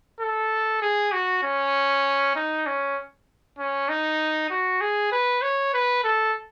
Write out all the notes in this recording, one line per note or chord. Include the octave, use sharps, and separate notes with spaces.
A4
G#4
F#4
C#4
D#4
C#4
C#4
D#4
F#4
G#4
B4
C#5
B4
A4